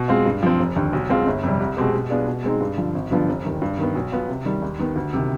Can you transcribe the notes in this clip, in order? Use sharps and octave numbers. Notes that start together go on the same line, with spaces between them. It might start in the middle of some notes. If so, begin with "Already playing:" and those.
Already playing: B2
G#3 C4 F4
G2
F3 C4
F1
D#2 D3
B1
B2 G#3 C4 F4
G1
F2 C3 G3
C2
B2 G#3 C4 G4
B2
B3 D4 F4 G#4
B2
G#3 C4 D#4
G2
D3 F3
G#1
G2 D3 F3 B3
F1
D#2 D#3
G2
D#3 B3
B1
B2 B3 F4
C3
D#3 G3
D#2
D#3 B3
D2
C3 D#3